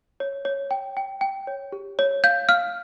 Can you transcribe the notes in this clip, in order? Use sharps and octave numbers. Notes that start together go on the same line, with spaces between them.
C#5
C#5
G5
G5
G5
C#5
G4
C#5
F5 G6
F5 F6